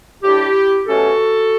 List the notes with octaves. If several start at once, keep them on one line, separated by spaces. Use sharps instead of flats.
A2 G3 D4 E4 G4
B2 F#3 A3 C#4 F#4 A4